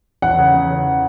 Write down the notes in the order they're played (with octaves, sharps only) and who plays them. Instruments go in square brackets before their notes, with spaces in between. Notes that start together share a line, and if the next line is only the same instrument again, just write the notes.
[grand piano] E2 [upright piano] F#5
[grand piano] C#3
E2
C#3